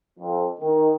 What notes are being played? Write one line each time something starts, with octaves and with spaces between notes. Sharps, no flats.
F2
D#3